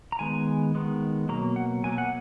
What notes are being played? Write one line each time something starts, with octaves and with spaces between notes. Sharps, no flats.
A#5
D#3 G#3 B3 G#5
D#3 G#3 B3
B2 F#3 A#3 A#5
F#5
B2 F#3 A#3 G#5
F#5